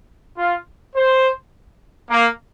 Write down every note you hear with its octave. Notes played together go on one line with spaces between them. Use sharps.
F4
C5
A#3